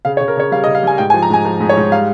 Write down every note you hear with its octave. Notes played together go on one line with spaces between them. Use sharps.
C#3 F5
C#5
C#3
A#4
C#3 C#5
G3 F5
D#5
C#3
F5
G3 G#5
G#2 G5
G#5
F3
A#5
G#2 G#5
F3
G#2
C#5
G#2
G3 F5